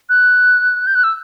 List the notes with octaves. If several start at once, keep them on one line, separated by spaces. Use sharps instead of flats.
F#6
G6
F#6
E6